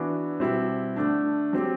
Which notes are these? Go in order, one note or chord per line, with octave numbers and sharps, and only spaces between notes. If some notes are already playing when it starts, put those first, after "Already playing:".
Already playing: E3 B3 D4 F#4
B2 G3 C4 E4 G4
D3 A3 D4
F#3 C4 G4